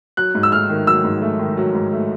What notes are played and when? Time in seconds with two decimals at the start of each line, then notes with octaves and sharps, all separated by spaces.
0.17 F#3 F#6
0.35 G#2
0.43 E6
0.52 A3 F6
0.69 D#3
0.87 F#3 E6
1.05 G#2
1.22 A3
1.39 D#3
1.57 F#3
1.75 G#2
1.92 A3